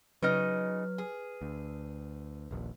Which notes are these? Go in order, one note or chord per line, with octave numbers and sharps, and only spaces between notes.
C#3 F#3 D#4 B4 D#5 F6
G#4
D2
D#1 A#1